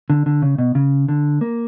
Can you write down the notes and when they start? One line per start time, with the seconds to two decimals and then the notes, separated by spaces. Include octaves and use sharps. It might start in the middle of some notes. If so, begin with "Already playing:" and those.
0.10 D3
0.26 D3
0.42 C#3
0.58 B2
0.75 C#3
1.08 D3
1.41 A#3